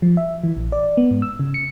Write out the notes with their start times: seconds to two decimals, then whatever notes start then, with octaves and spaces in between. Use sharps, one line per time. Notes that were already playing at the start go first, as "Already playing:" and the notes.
0.02 F3
0.17 E5
0.44 E3
0.57 A#1
0.72 D5
0.97 B3
1.11 G#2
1.22 E6
1.40 C#3
1.54 C#7